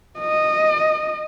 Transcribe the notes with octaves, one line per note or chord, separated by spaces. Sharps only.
D#5